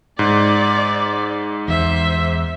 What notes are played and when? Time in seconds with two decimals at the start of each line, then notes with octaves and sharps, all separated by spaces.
0.19 G#2 D5
1.68 E2 C5 E5